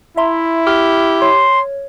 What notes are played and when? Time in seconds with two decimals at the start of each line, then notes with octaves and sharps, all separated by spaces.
0.17 E4 E5 A#5 C6
0.67 G4 F6
1.22 C#5 C6